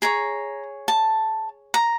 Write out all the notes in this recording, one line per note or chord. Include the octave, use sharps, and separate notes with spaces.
G#4 C#5 A#5
A5
A#5